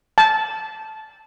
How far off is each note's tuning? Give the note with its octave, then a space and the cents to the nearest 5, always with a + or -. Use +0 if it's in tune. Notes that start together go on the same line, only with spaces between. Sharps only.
A5 -10